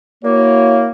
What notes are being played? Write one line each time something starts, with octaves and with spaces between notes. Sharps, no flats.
A#3 E4 F#4 C#5